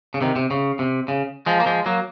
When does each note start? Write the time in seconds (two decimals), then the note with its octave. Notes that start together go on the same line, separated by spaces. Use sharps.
0.14 C#3
0.21 C3 D#3
0.36 C3
0.51 C#3
0.79 C3
1.08 C#3
1.46 F3 G#3
1.60 A#3
1.66 F3 G#3
1.86 F#3 A#3